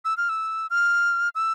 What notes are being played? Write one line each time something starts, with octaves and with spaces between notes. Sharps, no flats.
E6
F6
E6
F6
E6